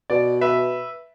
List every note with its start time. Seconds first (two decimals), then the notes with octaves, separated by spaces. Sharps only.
0.10 B2 D5
0.41 B4 E5